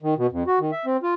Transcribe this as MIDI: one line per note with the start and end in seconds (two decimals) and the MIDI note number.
0.02 0.14 51
0.17 0.27 47
0.32 0.43 41
0.47 0.59 66
0.60 0.71 51
0.72 0.86 76
0.86 0.97 60
1.03 1.14 65